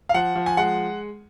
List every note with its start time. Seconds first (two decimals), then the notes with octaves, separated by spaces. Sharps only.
0.09 F5
0.14 F3 F#5
0.35 F3
0.46 G#5
0.57 G#3 F#5